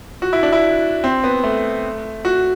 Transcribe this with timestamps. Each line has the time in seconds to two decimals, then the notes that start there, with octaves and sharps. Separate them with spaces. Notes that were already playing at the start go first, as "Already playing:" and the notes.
0.22 F#4
0.33 E4
0.43 D4
0.52 E4
1.04 C4
1.24 B3
1.44 A3
2.25 F#4